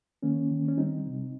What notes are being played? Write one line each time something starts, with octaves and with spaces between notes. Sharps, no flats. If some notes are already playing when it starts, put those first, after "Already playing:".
D#3 A#3 C#4
D#3
C#4
G3 C4 D#4
C3